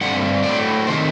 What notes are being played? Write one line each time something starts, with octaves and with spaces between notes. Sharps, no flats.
G2 D3 A3 C4 F#5
A2 F#3 A3 D5
C3 D#3 A3 C5